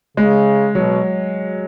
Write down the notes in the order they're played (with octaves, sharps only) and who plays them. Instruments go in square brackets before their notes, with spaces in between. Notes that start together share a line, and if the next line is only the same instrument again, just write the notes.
[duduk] C#3 [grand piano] G#3
[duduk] B2 [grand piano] F#3